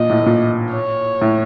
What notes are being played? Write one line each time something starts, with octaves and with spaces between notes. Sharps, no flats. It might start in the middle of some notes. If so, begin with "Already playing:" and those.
Already playing: A#2 D#5
A2
A2
A#2
C#5
A2